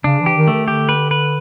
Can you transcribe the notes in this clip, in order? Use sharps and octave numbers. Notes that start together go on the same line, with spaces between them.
C#3 D4
E3
G4
D#3
D#3 A3
D3 G4
B4
B4